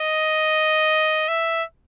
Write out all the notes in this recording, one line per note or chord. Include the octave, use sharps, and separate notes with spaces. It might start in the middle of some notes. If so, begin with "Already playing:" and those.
Already playing: D#5
E5